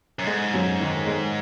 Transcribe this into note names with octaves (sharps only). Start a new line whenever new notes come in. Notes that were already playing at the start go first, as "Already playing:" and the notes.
F#2
G#2 G#3
F#2
D#3
G#3